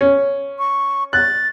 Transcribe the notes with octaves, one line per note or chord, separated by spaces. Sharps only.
C#4
C#6
F#6 A6